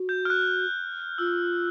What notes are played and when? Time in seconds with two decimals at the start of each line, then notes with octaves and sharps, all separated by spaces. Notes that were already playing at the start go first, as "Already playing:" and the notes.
Already playing: F#4
0.09 G6
0.25 F6
0.30 F#6
1.18 F4 E6